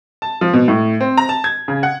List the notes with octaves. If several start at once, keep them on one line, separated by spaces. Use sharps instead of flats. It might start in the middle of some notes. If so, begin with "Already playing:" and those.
A5
F3
B2
A2
C4
A#5
A5
G#6
C#3
F#5